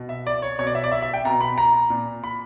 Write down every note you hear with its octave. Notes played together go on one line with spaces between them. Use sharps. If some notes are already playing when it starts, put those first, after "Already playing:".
Already playing: B2
E5
D5
C#5
B2 C#5
D5
E5
D5
E5
E5
G5
B2 A#5
B5
A#5
A#2
B5